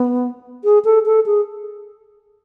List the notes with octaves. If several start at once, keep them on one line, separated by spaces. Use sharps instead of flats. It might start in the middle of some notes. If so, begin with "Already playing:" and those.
Already playing: B3
G#4
A4
A4
G#4